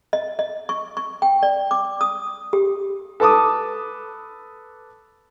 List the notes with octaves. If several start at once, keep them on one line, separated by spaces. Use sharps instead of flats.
D#5
D#5
C#6
C#6
G5
D5
D6
D#6
G4
A4 B4 A5 D6 D#6